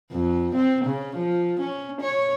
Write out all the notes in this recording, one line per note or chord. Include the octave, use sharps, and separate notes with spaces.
F2
C4
C#3
F3
C#4
C#5